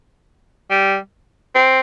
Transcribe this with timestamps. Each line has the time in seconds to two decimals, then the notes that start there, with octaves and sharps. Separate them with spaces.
0.70 G3
1.55 C4